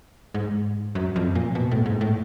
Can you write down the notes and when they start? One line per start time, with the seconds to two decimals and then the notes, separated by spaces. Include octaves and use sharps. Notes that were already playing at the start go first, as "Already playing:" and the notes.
0.34 G#2
0.95 F#2
1.16 F2
1.35 A#2
1.55 B2
1.71 A2
1.86 G#2
2.01 A2